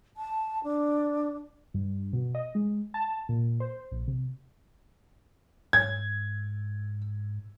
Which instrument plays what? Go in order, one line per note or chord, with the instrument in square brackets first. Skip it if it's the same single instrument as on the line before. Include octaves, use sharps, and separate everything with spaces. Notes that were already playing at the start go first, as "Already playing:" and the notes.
[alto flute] A5
D4
[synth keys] G2
B2
D#5
G#3
A5
A#2
C5
A#1
C3
[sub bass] G#2 [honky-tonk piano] G#6